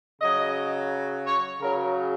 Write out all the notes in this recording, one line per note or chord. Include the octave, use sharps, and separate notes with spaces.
C#3 F#3 D#5
C#5
C#3 F#3 A#4